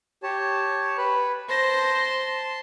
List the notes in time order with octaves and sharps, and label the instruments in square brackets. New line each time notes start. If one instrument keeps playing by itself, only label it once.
[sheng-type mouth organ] G4 C#5 A5
B4 B5
[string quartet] C5 A#6 [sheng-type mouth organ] A5 C6